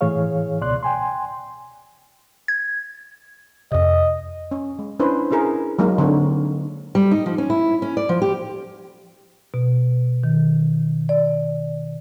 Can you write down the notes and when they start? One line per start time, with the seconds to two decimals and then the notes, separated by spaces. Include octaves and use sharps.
0.01 A2 E3 G#4 C#5 F5
0.61 C#2 B2 D5 C6 F#6
0.83 G5 G#5 C6
2.48 G#6
3.72 F2 C3 D#5
4.51 C#4
4.79 G#3
4.99 C#4 D4 E4 B4 C5
5.31 C#4 E4 G#4 A#4
5.79 F#3 G#3 A#3 D#4
5.98 D3 C4 D4 C#5
6.95 G3
7.11 D#4
7.26 F3
7.38 C#4
7.50 E4
7.82 C#4
7.97 D5
8.09 F3
8.22 G4
9.54 B2
10.24 D#3
11.09 D5